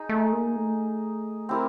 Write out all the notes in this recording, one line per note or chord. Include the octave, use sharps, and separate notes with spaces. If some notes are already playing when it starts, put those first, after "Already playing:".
Already playing: D#4 G#4
A3
A#3
A3
C4 E4 G4 A#4